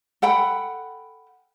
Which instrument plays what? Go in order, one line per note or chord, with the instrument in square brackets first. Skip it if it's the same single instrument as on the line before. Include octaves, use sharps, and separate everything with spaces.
[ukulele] A4 F#5 G5 B5